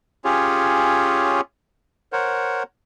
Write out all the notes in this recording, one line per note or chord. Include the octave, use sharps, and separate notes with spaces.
C#4 F4 G4 G#4 C#5
A#4 C5 C#5 F#5